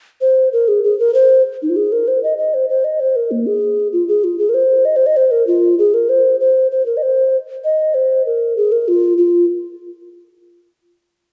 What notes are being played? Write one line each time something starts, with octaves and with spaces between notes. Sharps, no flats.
C5
A#4
G#4
G#4
A#4
C5
D#4
F4
G#4
A#4
C5
D#5
D#5
C5
C5
D#5
C5
A#4
A#3
G#4
F4
G#4
F4
G#4
A#4
C5
D#5
C5
D#5
C5
A#4
F4
G#4
A#4
C5
C5
C5
A#4
D#5
C5
D#5
C5
A#4
G#4
A#4
F4
F4